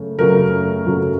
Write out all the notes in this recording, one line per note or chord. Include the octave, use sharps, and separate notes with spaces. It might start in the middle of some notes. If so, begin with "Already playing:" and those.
Already playing: F#2 C#3 A3
F#2 C#3 F#3 A3 A#4
F#2 C#3 F#3 A3